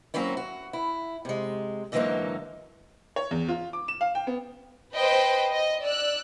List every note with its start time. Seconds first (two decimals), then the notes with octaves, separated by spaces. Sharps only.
0.14 F#3 A#3 C4 C#4 E4
0.37 F#4
0.73 E4
1.25 C3 G#3
1.92 G#2 D3 E3 F#3 A#3 D#4
3.16 C#5
3.31 E2
3.48 F4
3.73 D6
3.88 E7
4.01 F5
4.15 G5
4.27 B3
4.95 B4 C5 D#5 G5
5.53 D#5
5.83 D5 E6 F#6